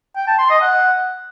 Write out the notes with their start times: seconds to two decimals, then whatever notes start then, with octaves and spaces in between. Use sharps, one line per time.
0.16 G5
0.27 A5
0.39 C6
0.50 D#5
0.61 F#5